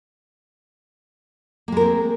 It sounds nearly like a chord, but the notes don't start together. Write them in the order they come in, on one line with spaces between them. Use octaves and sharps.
A#3 G#3 A#4 C4